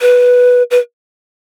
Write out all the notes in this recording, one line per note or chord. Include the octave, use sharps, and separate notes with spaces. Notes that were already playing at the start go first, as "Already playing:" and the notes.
B4
B4